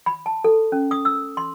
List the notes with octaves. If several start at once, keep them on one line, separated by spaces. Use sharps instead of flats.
B5
A5
A4
C#4
D#6
E6
C6